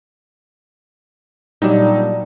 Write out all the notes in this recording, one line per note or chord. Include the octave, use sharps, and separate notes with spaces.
A#2 F#3 G3 D4 D#4